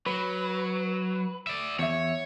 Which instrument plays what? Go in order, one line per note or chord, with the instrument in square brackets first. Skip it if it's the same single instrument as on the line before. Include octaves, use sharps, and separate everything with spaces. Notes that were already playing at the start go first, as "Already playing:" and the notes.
[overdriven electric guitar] F#3 [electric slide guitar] B4
[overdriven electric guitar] D5 E5
[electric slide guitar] E2 E5 [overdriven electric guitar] C#5